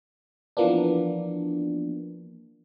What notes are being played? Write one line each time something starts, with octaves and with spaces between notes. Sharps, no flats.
E3 F3 A#3 B3 D4